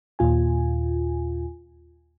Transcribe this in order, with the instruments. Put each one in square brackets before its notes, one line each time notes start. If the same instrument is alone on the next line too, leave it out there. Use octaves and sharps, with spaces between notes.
[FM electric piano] D#2 A#2 F4 G#5